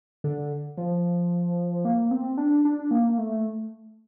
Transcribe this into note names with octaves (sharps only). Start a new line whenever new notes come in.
D3
F3
A#3
C4
D4
D4
A#3
A3